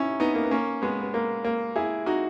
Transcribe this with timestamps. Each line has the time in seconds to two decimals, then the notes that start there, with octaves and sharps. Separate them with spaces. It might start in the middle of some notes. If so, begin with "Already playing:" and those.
Already playing: C#4 D#4 E4
0.20 B3 D#4
0.35 A#3
0.44 B3
0.51 A#3 C#4
0.82 G#3 B3
1.02 B3
1.14 A#3
1.45 A#3
1.76 E4 G#4
2.06 D#4 F#4